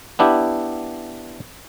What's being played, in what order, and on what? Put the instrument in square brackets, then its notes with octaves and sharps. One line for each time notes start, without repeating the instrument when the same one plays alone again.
[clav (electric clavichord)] B3 D4 E4 G4